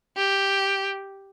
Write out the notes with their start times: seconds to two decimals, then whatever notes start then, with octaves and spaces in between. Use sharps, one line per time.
0.17 G4